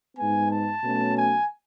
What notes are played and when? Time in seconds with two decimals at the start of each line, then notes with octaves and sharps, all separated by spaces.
0.17 G#2 G#3 B3 G#5
0.49 A5
0.83 B2 F#3 A3 C#4
1.15 G#5